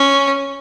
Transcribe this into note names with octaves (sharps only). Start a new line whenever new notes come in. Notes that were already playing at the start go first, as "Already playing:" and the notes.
Already playing: C#4